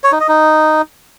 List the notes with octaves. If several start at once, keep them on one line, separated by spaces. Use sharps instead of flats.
C#5
D#4
D#5
D#4